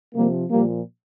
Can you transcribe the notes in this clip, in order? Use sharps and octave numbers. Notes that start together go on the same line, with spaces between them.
C3 F3 G3 A#3
A#2 F3 G3 A#3